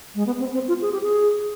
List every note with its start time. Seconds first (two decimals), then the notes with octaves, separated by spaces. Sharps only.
0.15 G#3
0.26 B3
0.40 C4
0.54 C4
0.68 F4
0.82 G#4
0.92 G4
1.02 G#4